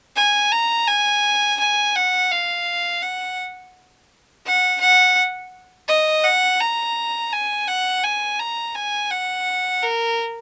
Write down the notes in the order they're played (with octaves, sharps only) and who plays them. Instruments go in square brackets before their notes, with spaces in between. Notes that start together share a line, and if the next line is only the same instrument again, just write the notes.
[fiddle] G#5
A#5
G#5
G#5
F#5
F5
F#5
F#5
F#5
D#5
F#5
A#5
G#5
F#5
G#5
A#5
G#5
F#5
A#4